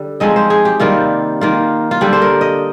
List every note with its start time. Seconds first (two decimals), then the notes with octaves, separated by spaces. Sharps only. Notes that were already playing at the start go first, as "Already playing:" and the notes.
Already playing: D3 G3
0.20 F3 G#3 C4 D#4 D#5
0.36 C5
0.50 G#4
0.65 G4
0.80 C3 D#3 G3 A#3 F4
1.41 D#3 A#3 F4
1.91 F4
2.01 D3 G3 D4 G4
2.13 C5
2.22 A#4
2.41 D#5